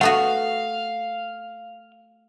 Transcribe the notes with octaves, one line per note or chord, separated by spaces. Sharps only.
A3 B3 F#4 F5 F#5